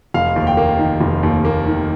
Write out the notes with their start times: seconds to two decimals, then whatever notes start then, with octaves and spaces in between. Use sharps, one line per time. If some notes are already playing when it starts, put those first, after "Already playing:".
0.14 F1 F5
0.36 D#2
0.47 G5
0.57 A#3
0.79 D#3
1.01 F1
1.23 D#2
1.45 A#3
1.67 D#3